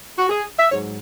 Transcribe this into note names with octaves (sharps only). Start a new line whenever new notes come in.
F#4
G#4
E5
G#2 F#3 C#5